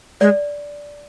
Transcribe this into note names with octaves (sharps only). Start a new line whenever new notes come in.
G#3 D5